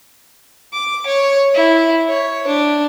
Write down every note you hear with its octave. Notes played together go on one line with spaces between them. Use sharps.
D6
C#5
E4
C#5
D4